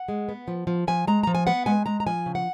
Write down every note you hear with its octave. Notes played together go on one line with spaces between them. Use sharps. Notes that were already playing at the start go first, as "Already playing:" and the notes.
Already playing: F#5
G#3
B3
F3
F3
F3 G#5
G#3 A#5
F3 A#5
G#5
B3 F#5
G#3 G#5
G#3 A#5
A#5
F3 G#5
C#3
F#5